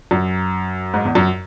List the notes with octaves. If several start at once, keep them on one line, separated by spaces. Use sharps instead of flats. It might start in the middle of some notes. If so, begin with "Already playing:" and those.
F#2
G#2
E2
F#2